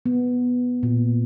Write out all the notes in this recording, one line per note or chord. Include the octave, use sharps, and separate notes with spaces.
B3
A#2